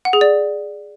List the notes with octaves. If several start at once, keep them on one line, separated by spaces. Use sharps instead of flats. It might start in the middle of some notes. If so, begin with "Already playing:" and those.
F#5
G#4
D5